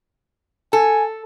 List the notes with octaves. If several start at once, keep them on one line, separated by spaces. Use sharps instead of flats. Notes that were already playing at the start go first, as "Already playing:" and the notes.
A4 G#5